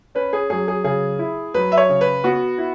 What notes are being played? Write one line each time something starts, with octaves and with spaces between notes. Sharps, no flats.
C#4 B4
G#4
F#3 G#4
G#4
C#3 G#4
E4
F#3 B4
E5
C#5
C#3
B4
B3 F#4
E4